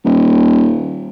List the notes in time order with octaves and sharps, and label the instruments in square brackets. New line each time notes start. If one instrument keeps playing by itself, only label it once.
[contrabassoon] D#1